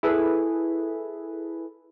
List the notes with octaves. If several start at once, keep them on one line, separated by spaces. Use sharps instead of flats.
E4 G#4 A4 B4